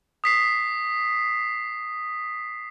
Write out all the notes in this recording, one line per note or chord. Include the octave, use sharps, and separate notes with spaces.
D#6 B6 C7